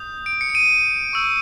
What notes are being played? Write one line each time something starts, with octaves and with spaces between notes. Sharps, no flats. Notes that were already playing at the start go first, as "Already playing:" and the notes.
Already playing: D#6 G6
D7
C#7
D7
D#7
C#6 E6 G6